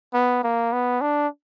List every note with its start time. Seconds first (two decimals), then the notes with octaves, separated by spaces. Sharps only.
0.14 B3
0.44 A#3
0.73 B3
1.01 D4